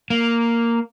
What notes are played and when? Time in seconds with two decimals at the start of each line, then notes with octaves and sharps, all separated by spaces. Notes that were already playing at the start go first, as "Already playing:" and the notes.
0.10 A#3